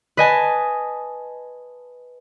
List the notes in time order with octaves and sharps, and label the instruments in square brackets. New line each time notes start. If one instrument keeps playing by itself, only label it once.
[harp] B4 D#5 G#5 A5